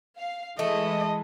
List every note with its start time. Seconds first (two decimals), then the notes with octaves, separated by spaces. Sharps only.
0.18 F5
0.59 E3 G#3 A3 D#5